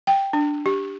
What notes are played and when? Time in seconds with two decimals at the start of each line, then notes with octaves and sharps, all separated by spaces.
0.07 G5
0.33 D4
0.66 G4